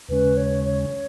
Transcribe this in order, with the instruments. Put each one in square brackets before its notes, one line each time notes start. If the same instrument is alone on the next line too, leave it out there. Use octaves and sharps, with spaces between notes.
[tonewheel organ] D#2 C#3 G#3 C#4 [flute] B4
[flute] C#5
C#5